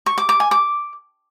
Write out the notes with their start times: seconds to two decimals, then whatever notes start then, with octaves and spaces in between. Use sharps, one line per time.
0.06 C#6
0.18 D6
0.29 D6
0.40 G#5
0.51 D6